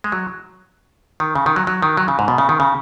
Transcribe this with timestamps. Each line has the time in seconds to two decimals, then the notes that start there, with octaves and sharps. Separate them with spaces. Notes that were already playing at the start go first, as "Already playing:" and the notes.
0.04 G#3
0.12 F#3
1.20 D#3
1.35 C#3
1.46 D#3
1.56 F#3
1.67 F#3
1.82 D#3
1.97 F#3
2.08 C#3
2.19 G#2
2.28 B2
2.38 C#3
2.49 D#3
2.60 C#3